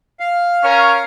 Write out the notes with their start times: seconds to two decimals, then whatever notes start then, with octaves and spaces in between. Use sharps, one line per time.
0.20 F5
0.62 C#4 A#4 C#5